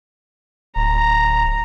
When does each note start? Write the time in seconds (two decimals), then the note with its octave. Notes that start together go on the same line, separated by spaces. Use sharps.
0.76 D1 A#5